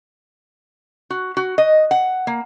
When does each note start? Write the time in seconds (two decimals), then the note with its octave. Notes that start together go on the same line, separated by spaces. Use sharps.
1.10 F#4
1.37 F#4
1.58 D#5
1.91 F#5
2.27 A#3